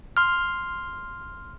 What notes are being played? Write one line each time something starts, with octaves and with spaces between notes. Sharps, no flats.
C6 F6